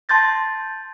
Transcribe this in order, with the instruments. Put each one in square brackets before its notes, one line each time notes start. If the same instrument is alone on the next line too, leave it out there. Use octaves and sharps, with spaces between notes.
[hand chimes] A5 C6 G6 A6 A#6